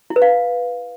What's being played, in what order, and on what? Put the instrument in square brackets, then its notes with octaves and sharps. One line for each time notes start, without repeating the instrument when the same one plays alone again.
[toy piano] E4
B4
F5